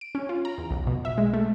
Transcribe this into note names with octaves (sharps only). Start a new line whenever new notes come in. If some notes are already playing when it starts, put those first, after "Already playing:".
D7
C#4
F4
A#5
E2
B1
B2
E5
G#3
A3